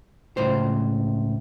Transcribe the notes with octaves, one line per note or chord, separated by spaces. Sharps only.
C#2 A2 C5